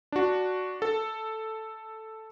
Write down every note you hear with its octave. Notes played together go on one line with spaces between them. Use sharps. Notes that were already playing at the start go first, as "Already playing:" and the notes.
D4 F#4
A4